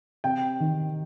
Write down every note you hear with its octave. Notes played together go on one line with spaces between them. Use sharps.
C3 G5
D#3